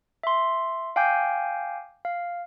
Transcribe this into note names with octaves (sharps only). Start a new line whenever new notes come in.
E5 C6
F5 G5 G#5 D6 G6
F5